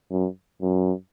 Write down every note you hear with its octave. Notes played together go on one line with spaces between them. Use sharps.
F#2
F#2